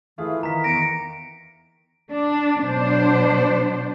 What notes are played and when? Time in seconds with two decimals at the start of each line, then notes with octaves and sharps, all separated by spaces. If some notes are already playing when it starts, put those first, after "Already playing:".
0.18 E3 A3 F4 G#4
0.43 D#3 A#5 B6
0.64 E2 D#3 A#6 C#7 D7
2.12 D4
2.60 B2 F#3 D4 C5